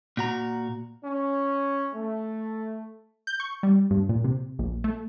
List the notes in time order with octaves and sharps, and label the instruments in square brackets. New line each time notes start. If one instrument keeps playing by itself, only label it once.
[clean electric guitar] A#2 F#4 A#5
[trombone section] C#4
A3
[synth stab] G6
C#6
G3
G2
A#2
C3
A#1
A3